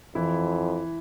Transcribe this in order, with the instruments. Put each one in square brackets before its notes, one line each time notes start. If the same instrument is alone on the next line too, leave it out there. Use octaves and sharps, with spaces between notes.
[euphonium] F2 [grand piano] E3 E4